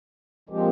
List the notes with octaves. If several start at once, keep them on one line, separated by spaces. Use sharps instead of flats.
A#2 F3 G#3 C4 G4